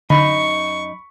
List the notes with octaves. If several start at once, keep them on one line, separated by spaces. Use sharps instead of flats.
F#2 D3 D#4 B5 C#6